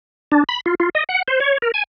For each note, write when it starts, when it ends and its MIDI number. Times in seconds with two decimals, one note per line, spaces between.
0.32 0.44 62
0.49 0.60 83
0.66 0.75 65
0.80 0.89 65
0.95 1.04 75
1.09 1.22 78
1.28 1.40 72
1.40 1.58 73
1.62 1.71 70
1.74 1.84 80